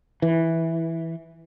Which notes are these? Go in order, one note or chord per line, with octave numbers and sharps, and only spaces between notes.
E3